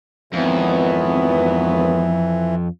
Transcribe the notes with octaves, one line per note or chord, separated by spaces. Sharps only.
G#1 F2 E3 F#3 B3